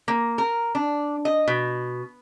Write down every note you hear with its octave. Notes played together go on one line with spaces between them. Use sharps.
A#3
A#4
D4
D#5
B2